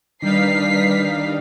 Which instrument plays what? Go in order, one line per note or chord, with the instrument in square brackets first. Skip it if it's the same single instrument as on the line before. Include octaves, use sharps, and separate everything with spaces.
[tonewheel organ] D#3 D4 [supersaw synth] G3 D#4 F5 [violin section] B4 B6 C7